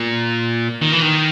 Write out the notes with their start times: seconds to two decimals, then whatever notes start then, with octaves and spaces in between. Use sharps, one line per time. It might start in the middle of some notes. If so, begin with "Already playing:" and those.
Already playing: A#2
0.82 D#3
0.92 E3
1.02 D#3